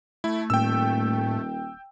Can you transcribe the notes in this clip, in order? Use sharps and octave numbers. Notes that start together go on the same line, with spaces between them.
A3 E4
D#1 A2 G5 E6